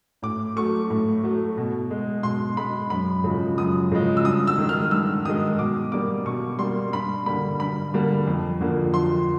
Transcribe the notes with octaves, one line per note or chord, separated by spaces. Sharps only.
A2 D6
F#3 A3 C#6
A2
F#3 A3
B2
G#3
B2 C6
G#3 B5
F#2 B5
C#3 F3 G#3
F#2 D#6
C#3 F3 G#3
E6
G2 D#6
E6
D#3 G#3
F6
G2 E6
D#3 G#3 D#6
B2 D6
G3 A#3 D6
B2 C#6
G3 A#3 C6
G2 B5
D3 G3 A#3 B5
G2 B5
D3 G3 A#3
F2
D3 F3 A#3
F2 C6